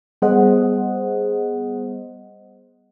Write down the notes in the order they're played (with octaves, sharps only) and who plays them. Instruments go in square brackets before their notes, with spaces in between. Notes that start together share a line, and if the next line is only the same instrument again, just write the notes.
[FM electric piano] G3 B3 G#4 C5 D#5 F#5